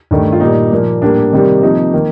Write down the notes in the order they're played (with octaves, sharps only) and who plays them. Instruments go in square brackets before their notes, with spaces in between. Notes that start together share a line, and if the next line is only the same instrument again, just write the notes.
[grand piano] G2 D#3 A3
F4
A#2 G3 A#3 D#4
A#2 F3 A#3
A2 G3 A#3 D4
C3 D#3 G3 A#3
C3 F3 A#3 D#4
D#3 A#3